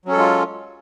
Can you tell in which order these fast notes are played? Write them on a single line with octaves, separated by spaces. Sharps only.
F#3 C#4 A4 G#3 F4